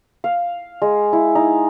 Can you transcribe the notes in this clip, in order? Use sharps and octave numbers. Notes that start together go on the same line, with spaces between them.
F5
G#3
E4
D#4